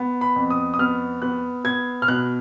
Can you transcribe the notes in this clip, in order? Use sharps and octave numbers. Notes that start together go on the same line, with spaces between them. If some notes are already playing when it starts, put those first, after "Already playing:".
Already playing: B3
B5
F2
D#6
D#6
B3 F6
B3 F#6
B3 G#6
F6
B2 F#6